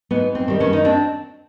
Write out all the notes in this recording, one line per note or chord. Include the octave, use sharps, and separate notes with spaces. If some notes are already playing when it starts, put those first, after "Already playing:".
G#2 B3
C4
D#3 G3
B3 C#4
D#4
C4 D4